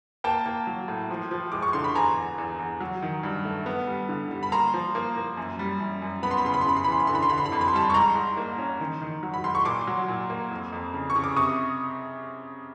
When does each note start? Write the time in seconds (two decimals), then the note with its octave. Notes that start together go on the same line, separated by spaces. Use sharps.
0.24 A#3 G5 A5
0.46 A#3
0.67 F#3
0.88 A2
1.10 F3
1.31 F3
1.52 G#3 D6
1.62 C#6
1.73 D3 C6
1.84 B5
1.95 E2 G#5 A#5
2.17 E2
2.38 E2
2.59 E2
2.80 F#3
3.02 D#3
3.23 G2
3.45 A3
3.66 B3
3.87 G3
4.09 D3
4.31 G3
4.43 B5
4.52 A#3 A#5 C6
4.74 F3
4.95 A#3
5.16 A#3
5.37 F#2
5.59 G3
5.80 F#2
6.02 F#2
6.23 B3 B5
6.31 C6
6.38 B5
6.45 C#3 C6
6.54 B5
6.61 C6
6.66 C#3 B5
6.77 C6
6.84 B5
6.88 E3 C6
7.00 B5
7.07 D3 C6
7.15 B5
7.23 C6
7.30 D3 B5
7.38 C6
7.46 B5
7.52 F2 C6
7.61 B5
7.68 C6
7.73 G3 A5 B5
7.90 C#6
7.94 G#2 A#5 C6
8.15 G#2
8.37 A#3
8.58 C#4
8.80 D#3
9.01 D#3
9.23 F#3
9.34 B5
9.44 G#2 C6
9.55 C#6
9.65 A#2 C6 D6
9.87 F#3
10.08 A#2
10.30 A#3
10.51 F2
10.73 F2
10.94 C#3
11.10 C#6
11.16 C#3
11.24 D6
11.36 C3 C#6 D#6